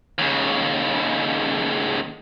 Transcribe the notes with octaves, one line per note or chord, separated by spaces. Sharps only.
D#2 C#3